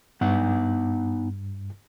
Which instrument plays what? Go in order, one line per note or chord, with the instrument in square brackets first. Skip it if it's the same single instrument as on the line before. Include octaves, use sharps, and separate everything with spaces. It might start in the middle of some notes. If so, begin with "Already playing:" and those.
[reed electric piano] G2 [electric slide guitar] B3 D#4 F#5